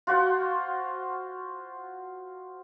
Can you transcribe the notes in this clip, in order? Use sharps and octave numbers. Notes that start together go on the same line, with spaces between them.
F4 F#4 C5